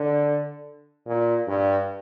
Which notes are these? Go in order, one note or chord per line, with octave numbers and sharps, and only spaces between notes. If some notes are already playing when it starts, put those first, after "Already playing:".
Already playing: D3
A#2
G2